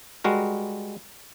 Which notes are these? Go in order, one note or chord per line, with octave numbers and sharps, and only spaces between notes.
G3 G#3 F#4 A#4